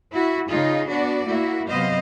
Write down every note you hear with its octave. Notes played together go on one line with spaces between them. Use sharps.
E4 F#4
C#3 D#4 F4 G#4
B3 D4 F#4 D5
A#3 E4 F#4
C3 F#3 B3 C5 D#5 F5